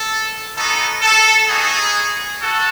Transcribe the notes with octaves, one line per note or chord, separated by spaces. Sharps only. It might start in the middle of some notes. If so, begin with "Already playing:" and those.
Already playing: A4
B3 D#4 F#4 A4
A4
B3 D#4 F#4 G#4
F#4 A4